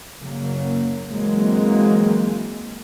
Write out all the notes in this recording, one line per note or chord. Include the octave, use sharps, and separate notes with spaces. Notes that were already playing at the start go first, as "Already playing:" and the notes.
F#1 C#3 F#3 A#3
E3 F#3 G#3 A#3 C4